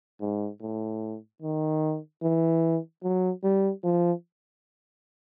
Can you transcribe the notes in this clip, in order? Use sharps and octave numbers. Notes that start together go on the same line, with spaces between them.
G#2
A2
D#3
E3
F#3
G3
F3